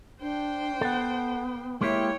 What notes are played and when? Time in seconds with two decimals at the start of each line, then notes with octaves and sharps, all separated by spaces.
0.21 D4 C5 G5
0.81 B3 A4 F#5
1.81 G#3 A#3 E4 G4 C#5 G5